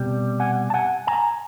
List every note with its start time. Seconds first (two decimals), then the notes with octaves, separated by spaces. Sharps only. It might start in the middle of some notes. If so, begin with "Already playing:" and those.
Already playing: C2 B2 G3
0.40 F#5 G#5
0.70 A5
0.74 F#5 G#5
1.07 G#5 A#5